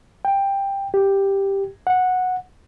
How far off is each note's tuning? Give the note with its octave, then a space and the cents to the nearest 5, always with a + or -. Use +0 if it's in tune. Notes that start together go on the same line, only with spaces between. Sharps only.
G5 +10
G4 +5
F#5 -10